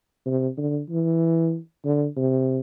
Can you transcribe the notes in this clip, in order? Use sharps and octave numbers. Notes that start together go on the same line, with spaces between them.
C3
D3
E3
D3
C3